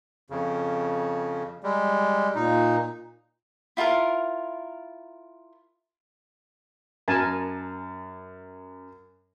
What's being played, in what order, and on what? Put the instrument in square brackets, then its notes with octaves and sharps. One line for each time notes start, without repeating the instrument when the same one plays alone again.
[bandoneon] F2 C#3
G3 G#3
[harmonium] A#2 [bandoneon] D#4
[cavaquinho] E4 F4 A4 A#4
[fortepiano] F#2 [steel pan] A#4 G#5 A5